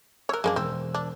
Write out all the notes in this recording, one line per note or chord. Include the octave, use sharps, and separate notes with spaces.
A#4 C#5 E6 F#6
F#2 G#3 A#3 D4
E1 C4 C5 E6
D4